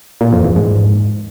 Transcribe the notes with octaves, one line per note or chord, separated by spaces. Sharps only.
A#2
F2
E2
G#2